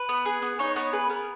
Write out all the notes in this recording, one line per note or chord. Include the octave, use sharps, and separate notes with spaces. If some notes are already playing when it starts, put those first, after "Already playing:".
Already playing: B4
B3
G#4
B3
D#4 C#5
B3 C#5
G#4 B4
B3 A#4